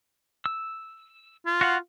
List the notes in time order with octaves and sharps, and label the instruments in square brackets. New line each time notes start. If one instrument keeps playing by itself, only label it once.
[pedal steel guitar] E6
[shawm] F4
[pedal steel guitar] F#4 F5 F#5